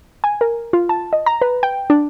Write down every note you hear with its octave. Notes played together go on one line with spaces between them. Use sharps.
G#5
A#4
F4
A5
D#5
A#5
B4
G5
D4